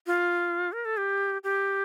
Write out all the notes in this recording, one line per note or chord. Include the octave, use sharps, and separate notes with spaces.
F4
A#4
A4
G4
G4